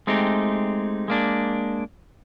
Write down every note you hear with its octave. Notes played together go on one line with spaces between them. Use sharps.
G#3 A3 C4 D#4 G4
G#3 A#3 D4